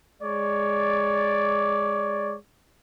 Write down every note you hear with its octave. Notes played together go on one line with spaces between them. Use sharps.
G#3 C#5 D5